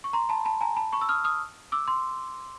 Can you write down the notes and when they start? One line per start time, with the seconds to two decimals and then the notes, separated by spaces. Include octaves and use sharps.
0.04 C#6
0.13 A#5 C6
0.29 A5 B5
0.45 A5 B5
0.61 G#5 A#5
0.77 A5 B5
0.93 B5 C#6
1.01 E6
1.09 D#6 F6
1.24 D#6 F6
1.72 D6 E6
1.88 C6